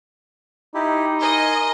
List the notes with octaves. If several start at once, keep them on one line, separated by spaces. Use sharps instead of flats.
D#4 E4 G4
A#4 D#5 G#5 C6